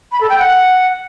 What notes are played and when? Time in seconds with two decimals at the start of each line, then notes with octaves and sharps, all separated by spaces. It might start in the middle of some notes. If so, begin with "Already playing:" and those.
0.12 B5
0.20 A4
0.29 G5
0.38 F#5